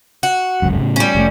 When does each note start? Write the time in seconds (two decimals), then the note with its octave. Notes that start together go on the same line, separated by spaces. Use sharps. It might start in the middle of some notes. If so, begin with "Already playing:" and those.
0.23 F#4
0.62 G1 C#2 F#2
0.79 A2 C#3
0.96 G3 C#4
1.15 F1 A2 A3